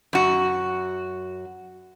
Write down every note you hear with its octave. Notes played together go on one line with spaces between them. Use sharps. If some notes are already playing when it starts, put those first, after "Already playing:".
F#2 F#4